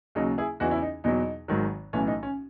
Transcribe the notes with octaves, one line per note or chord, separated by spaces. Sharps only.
D#2 C#3 F#3 D#4
E4 G#4
E2 C#3 E3 D#4 F#4
C#4 E4
D#4
E2 B2 F#3 D#4
G#1 G#2 D#3 F#3
B1 A2 E3 C#4
D#4
C#4